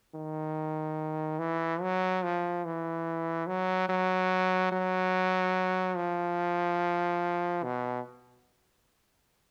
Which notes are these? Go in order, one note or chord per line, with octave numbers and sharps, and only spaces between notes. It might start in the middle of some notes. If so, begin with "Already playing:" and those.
D#3
E3
F#3
F3
E3
F#3
F#3
F#3
F3
B2